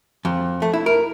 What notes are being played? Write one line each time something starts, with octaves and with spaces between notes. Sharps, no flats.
F2
A3
E4
A#4